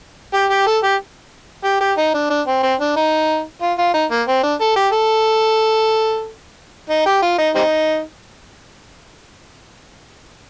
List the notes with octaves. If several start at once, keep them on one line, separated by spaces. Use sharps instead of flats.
G4
G4
A4
G4
G4
G4
D#4
D4
D4
C4
C4
D4
D#4
F4
F4
D#4
A#3
C4
D4
A4
G4
A4
D#4
G4
F4
D#4
G3 C4 D#4